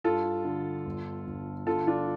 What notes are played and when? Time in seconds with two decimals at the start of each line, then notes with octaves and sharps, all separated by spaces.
0.04 G2 F4 A4
0.45 D3
0.86 G1
1.27 G1
1.67 D3 F4 A4
1.87 D4 F4